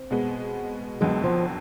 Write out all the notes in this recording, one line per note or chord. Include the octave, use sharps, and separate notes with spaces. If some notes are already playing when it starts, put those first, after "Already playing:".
Already playing: C4
B2 G#3 B3
F#1 F2 D3 F#3 G#3 B3
F3